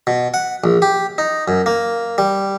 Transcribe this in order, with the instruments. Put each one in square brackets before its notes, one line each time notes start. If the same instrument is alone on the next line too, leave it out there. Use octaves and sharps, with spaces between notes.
[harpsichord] B2
F#5
A#1
G4
D#4
F#2
A#3
G3